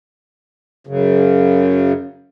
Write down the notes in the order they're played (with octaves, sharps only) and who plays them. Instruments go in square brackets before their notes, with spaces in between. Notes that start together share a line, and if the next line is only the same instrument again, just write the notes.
[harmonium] F#2 C#3